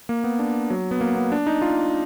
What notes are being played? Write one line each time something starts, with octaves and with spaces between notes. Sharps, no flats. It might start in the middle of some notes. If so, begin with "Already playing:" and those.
A#3
B3
D4
F#3
B3
A#3
B3
D4
D#4
F4